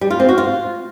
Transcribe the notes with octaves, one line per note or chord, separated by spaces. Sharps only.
G3
F4
C4
F#4
F4